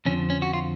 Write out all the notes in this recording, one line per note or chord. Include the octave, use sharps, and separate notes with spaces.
F2 D3 F3 C#4
C#4
F#4
F4